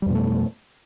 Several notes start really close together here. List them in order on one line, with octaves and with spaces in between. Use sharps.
G3 F2 B2 A3